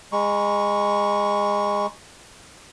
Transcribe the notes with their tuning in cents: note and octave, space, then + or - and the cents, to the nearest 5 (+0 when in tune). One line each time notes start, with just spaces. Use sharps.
G#3 -20 A#5 +35 C#6 +0